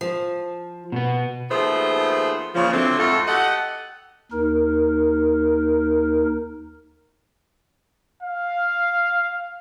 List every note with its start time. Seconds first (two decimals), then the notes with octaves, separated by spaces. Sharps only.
0.01 F3
0.92 B2 B3
1.50 D#2 F3 A3 B3 G#4 C5
2.55 A#2 C#3 F3
2.72 D3 F#3 A3 C4
2.99 F2 G#2 A3 F4 F#4 A4
3.27 G4 A4 D#5 F#5
4.32 D#2 D#4 A#4
8.22 F5